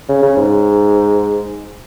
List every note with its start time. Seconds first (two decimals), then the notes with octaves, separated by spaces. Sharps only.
0.09 C#3
0.22 C#3
0.37 G#2